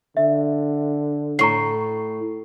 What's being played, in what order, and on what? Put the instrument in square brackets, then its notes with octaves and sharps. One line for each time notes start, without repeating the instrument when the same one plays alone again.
[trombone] D3 [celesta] E5
[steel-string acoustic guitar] A2 [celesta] A#5 C#6 C7